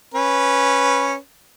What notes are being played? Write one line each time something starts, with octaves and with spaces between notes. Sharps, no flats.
C#4 B4